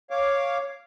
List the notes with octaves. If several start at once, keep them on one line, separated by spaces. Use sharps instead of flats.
C#5 F5 D6